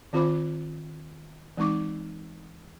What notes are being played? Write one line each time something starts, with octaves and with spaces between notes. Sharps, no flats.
D#3 C4 F4 C5 B5 D6
E3 G#3 C4 D#4 C#6 D6